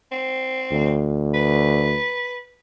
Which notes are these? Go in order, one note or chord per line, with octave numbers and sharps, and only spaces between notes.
C4
D2
B4